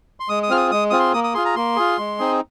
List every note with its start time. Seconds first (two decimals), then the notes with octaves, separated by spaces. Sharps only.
0.20 C6
0.29 G#3 D#6
0.43 D#6
0.49 C4 F4 G#4 F6
0.57 D#6
0.71 G#3 D#6
0.90 C4 F4 G#4 D#6
0.99 C6
1.13 A#3 D#6
1.24 D#6
1.34 F4 G#4 C6
1.45 A#5
1.56 A#3 C6
1.76 F4 G#4
1.98 G#3
2.19 C4 D#4 G#4